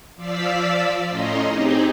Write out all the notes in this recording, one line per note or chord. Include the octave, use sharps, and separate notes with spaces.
F3 D5 F5 E6 B6
A2 C#4 D#5 A#5 C6
C4 D#4 G4 G#4